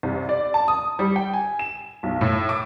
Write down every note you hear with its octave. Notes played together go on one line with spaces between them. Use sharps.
C2
D5
A5
D#6
G3
G5
G#5
E7
B1
A2
D6